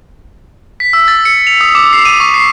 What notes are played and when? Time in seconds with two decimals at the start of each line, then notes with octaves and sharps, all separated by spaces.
0.80 B6
0.93 E6
1.08 A6
1.25 C#7
1.47 F7
1.61 D#6
1.75 D6
1.93 C7
2.05 D#7
2.20 C#6
2.34 C7